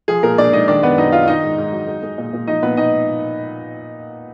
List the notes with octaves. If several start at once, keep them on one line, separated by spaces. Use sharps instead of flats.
F3 G#4
A#2 A#4
A#2 D4 D5
G#3 D#4 D#5
D#3 D4 D5
F#2 B3 B4
F#2 D#4 D#5
G#3 F4 F5
D#3 D#4 D#5
G#2
G#2
F#3
G#3
G#3
A#2
A#2
F3 D#4 D#5
A#2 B3 B4
A#2 D#4 D#5